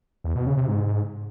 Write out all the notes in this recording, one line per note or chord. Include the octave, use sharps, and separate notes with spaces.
E2
B2
C#3
C3
G#2